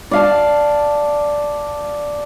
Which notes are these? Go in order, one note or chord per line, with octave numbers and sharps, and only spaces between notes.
D5 F5 A5